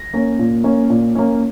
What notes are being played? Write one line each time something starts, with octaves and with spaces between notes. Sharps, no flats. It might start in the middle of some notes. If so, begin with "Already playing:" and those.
Already playing: A#6
A#3 C#4
A#2
A#3 C#4
A#2
A#3 C#4